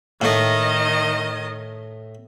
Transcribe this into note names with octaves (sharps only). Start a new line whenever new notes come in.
A2 D#3 A3 D#5